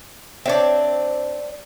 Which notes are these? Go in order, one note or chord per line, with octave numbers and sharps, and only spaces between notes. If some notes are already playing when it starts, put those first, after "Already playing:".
C4 D4 C#5 D5 E5